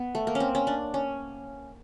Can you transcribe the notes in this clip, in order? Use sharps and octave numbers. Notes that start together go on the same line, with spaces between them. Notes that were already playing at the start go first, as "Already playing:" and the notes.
Already playing: B3
A3
A#3
C#4
C4
C#4
D4
C#4